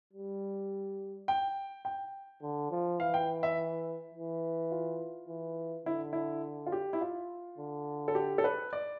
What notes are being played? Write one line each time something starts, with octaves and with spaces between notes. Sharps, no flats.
G3
G5
G5
D3
F3
E3 F5
G5
E5
E3
F4
E3
D3 E4
E4
F4
G4
E4
F4
D3
A4
G4
A4
B4
D5